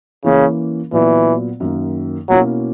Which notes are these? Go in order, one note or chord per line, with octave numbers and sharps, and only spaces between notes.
C#3 E3 A#3 C#4
A#2 E3 F#3 B3
F#2 D#3 A#3
B2 F#3 A#3 C#4 E4